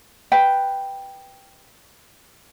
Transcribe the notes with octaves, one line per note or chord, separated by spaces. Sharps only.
B4 G5